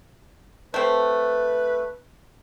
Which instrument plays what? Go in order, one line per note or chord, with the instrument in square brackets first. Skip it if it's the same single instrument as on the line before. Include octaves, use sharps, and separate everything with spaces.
[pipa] A3 C4 [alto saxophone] B4